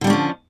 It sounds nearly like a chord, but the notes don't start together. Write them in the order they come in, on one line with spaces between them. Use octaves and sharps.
D3 G3 D4 C#4 F3